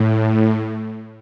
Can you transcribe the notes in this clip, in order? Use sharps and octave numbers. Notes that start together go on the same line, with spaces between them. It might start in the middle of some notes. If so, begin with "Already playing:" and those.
Already playing: A2